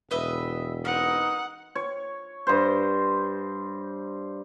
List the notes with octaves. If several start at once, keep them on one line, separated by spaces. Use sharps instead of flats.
E1 B4 D#5 E5
B3 C4 D#4 A#4 F#5
C#5
G2 C5